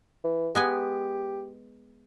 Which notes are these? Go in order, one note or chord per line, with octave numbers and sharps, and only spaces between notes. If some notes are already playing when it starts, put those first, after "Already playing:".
E3
G#3 B3 G4 G#5